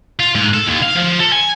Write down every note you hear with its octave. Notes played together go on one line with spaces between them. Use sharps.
F4
G#2
A4
D#2
F5
F3
A4
G#5